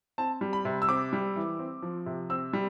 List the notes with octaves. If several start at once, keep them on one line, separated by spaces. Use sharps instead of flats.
C4 A5
G3
B5
C3
E6
C4 D6
G3
E3
C4
F3
C3
C4 E6
G3